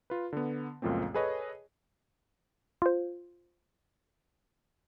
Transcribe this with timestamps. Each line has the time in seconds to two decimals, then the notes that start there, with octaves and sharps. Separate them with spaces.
0.10 F4 B4
0.33 D3 B3
0.82 C#2 F#2 A#2 F3 A3 C4
1.14 G#4 A4 B4 C#5 D#5
2.82 F4 C5